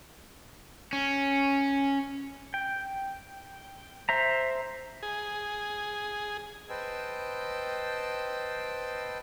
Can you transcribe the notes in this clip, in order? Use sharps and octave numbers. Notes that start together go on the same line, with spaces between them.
C#4
G5
C5 E5 A#5
G#4
B4 C5 D#5 G5 A5 E6